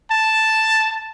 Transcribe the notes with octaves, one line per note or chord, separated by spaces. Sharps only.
A5